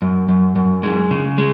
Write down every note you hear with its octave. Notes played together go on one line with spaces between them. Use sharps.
F#2
F#2
F#2
G#3
C#3
G#3